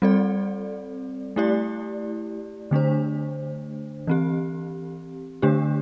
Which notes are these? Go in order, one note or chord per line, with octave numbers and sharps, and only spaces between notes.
G3 C4 A4 D5
A3 E4 G4 D5
D3 A3 D4 C5
E3 C4 G4
D3 A3 D4 G4